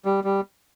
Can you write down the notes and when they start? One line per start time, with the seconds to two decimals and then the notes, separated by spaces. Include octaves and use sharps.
0.05 G3
0.24 G3